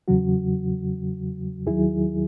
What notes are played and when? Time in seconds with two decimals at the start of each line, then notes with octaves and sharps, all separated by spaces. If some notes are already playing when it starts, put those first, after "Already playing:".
0.08 E2 C#3 F#3 F#4
1.67 D#2 D#3 F#3 E4 G#4